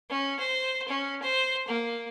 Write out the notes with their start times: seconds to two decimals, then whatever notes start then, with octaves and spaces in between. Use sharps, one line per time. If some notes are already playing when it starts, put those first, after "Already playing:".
0.10 C#4
0.40 C5
0.88 C#4
1.22 C5
1.68 A#3